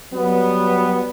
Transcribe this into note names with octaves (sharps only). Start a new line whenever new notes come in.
F#3 G3 B3